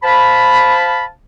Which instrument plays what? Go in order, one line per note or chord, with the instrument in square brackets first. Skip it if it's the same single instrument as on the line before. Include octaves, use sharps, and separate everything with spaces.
[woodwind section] C5 F5 A5 B5